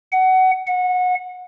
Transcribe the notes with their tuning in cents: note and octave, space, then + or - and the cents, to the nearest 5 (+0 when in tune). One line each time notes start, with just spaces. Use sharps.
F#5 +20
F#5 -25